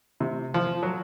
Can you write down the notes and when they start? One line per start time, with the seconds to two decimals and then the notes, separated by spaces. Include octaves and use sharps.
0.20 C3
0.54 F3
0.83 F#3